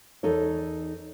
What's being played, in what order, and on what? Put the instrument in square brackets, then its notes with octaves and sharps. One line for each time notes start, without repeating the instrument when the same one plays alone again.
[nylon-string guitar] E2 D#4 A4 A#4 C#5